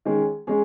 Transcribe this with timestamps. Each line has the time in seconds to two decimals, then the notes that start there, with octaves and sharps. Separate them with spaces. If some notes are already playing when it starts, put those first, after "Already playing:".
0.05 D#3 G#3 C#4 G#4
0.47 G#3 C#4 G#4